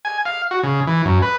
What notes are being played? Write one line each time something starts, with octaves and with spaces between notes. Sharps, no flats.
G#5
F5
F#4
C#3
E3
F#2
B4